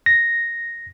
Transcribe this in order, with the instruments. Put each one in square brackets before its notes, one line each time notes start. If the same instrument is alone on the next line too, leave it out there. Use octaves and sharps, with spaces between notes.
[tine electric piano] A#6